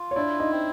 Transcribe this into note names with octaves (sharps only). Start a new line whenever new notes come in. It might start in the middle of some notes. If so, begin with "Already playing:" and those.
Already playing: F4
C#5
D4 E4 D5
D#4 D#5
C4